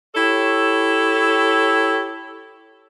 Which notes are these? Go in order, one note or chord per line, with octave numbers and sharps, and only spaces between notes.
E4 G4 A4 C#5